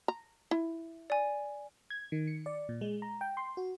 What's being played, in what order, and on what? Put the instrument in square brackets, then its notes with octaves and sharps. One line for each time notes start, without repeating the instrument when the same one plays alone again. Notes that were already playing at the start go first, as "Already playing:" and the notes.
[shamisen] A#5
E4
[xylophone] D5 G#5
[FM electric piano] G#6
D#3
C#7
D5
A#2
G#3
A#5
G5
C6
F#4